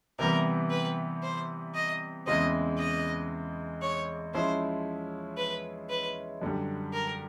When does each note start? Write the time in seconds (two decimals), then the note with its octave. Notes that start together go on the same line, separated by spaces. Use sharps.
0.19 C3 E3 G3 B3 A#4
0.71 B4
1.23 C5
1.74 D#5
2.26 E2 C#3 E3 G#3 C4 D#5
2.78 D#5
3.82 C#5
4.34 F3 G#3 C#4 E4 C5
5.37 B4
5.90 B4
6.42 F#2 D3 G3
6.93 A#4